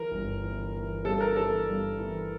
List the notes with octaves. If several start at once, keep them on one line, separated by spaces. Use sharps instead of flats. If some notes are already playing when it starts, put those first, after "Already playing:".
Already playing: E3 A#4
G1
E3
E3
G2 A4
A#4
E3 A4
G2
E3